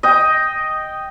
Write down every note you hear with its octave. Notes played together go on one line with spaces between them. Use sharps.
D#5 G5